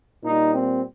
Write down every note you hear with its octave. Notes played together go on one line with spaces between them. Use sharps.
A#2 G3 D#4
C4